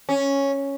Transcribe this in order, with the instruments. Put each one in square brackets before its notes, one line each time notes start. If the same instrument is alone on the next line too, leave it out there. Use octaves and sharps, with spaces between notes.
[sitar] C#4